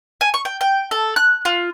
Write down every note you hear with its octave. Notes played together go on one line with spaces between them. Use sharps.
G#5
C#6
G5
G5
A4
F#6
F4